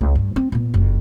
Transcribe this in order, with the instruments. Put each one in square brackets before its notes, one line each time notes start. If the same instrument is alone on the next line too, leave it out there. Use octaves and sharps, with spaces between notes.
[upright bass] C#2
G2
C4
A#2 B3
F#1 F2